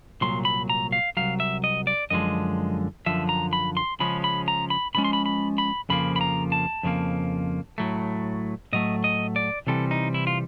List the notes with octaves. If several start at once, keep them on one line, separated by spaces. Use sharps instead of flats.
C2 A#2 F#3 C6
B5
A#5
F5
C2 A#2 F#3 F5
E5
D#5
D5
F#2 D3 F3 G#3 D#5
F#2 D3 F3 E5
A#5
B5
C6
C#3 F3 G#3 C#4 B5
B5
A#5
B5
C#3 F3 G#3 C#4 B5
C6
B5
B5
B5
F2 C#3 F3 A#3 B5
B5
A#5
A5
F2 C#3 F3 A#3
A2 F#3 A3
A2 F#3 A3 D#5
D#5
D5
C3 E3 G3 C4 A4
D#4
E4
F4